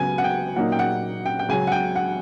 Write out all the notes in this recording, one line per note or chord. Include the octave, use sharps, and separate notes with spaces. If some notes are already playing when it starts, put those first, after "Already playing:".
Already playing: C#2 C#3 F#3 B3 G#5
F#5
G5
A#2 F#3 A#3 D#4 F#5
G5
F#5
G5
G5
C#2 C#3 F#3 G#5
F#5
G5
F#5